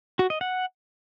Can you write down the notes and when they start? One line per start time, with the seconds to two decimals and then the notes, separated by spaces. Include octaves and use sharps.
0.19 F#4
0.30 D#5
0.41 F#5